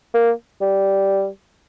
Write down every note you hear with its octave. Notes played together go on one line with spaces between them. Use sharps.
A#3
G3